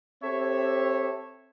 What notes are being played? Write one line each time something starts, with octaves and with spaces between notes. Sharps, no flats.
C4 G4 A4 C#5 E5